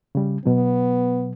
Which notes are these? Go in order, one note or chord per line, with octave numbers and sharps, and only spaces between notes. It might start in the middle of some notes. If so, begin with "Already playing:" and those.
C#3 G3
B2 F#3 B3